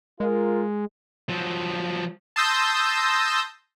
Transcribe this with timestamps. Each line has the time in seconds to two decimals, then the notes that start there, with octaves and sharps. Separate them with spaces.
0.20 G#3 F4 A#4
1.29 F3 F#3
2.36 A5 C6 D#6 E6 G6 A#6